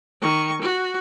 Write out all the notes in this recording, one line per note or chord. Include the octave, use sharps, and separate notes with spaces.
D#3 C#6
F#4